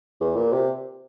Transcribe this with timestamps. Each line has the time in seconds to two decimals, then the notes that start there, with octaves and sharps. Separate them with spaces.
0.20 E2
0.36 A#2
0.53 C3